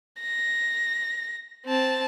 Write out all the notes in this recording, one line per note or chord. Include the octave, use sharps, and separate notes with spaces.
A#6
C4 A5